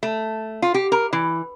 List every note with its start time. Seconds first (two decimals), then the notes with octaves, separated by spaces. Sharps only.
0.03 A3
0.62 F4
0.74 G4
0.92 A#4
1.13 E3